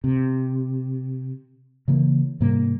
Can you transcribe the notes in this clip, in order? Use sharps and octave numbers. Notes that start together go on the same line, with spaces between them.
C3
C#3 E3 A#3
G#2 C3 G3 A#3